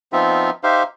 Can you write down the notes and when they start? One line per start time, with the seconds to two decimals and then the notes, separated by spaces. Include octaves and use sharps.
0.13 F3 B3 C4 D#4 F4 E5
0.64 D#4 G4 C5 E5 F5